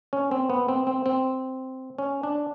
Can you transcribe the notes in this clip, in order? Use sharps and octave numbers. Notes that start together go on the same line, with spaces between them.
C#4
C4
B3
C4
C4
C4
C#4
D4